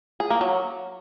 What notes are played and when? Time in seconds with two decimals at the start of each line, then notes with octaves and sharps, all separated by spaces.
0.20 G#4
0.30 A#3
0.41 F#3